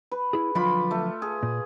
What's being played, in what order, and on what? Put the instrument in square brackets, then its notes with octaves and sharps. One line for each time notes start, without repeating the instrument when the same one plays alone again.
[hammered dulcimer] B4
[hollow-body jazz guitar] E4 G#4
[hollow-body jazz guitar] D3 F3 F#3 [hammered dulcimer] F4 B5 D6
[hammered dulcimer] A3
G#4
[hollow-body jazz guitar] A#2